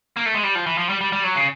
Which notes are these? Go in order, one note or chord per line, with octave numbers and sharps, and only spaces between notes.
A#3
A3
G#3
G3
F3
E3
F3
G3
G3
G3
F#3
C#3